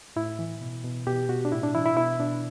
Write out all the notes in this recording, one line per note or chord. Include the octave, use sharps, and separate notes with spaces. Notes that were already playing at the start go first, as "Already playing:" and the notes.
A2 E4
E3
B2
B2
B2 G4
B2 F#4
D4
A2 E4
D4
E3 E4
E4
B2 E4
B2 D4